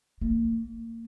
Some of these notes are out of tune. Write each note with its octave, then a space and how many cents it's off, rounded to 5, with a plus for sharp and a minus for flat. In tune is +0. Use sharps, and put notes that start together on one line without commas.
A#3 -30